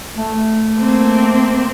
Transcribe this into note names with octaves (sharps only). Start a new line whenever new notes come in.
A3
A#3 C4